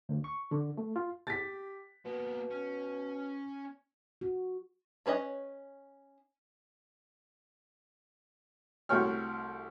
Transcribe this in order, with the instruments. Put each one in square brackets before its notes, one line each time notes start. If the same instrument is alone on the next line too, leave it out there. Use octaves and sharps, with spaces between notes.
[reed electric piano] D2
C#6
D3
A3
F4
[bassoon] G4 [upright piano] A6 B6
[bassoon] B2 [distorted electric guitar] A#3 B3
[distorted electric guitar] C#4
[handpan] F#4
[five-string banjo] C#4 B4 C#5 D#5
[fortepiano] C2 A3 F#4 C#5 G5 F6